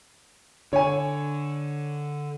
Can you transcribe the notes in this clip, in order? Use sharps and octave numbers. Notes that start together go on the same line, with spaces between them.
D3 C#5 G#5